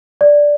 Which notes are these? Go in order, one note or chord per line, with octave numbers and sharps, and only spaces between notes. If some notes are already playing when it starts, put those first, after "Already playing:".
D5